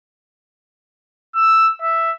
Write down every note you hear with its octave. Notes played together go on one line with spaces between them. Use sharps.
E6
E5